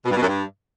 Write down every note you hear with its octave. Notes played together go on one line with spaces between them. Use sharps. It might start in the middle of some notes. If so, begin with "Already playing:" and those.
B2
G2
B2
F#2
G2